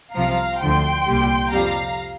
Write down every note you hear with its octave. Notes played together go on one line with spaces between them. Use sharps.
C2 C3 F3 F5 A#5
D2 D3 F3 G5 C6
C2 A#2 G3
F2 C3 G3 F5 A#5